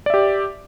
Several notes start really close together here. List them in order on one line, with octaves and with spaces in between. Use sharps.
D5 E5 G4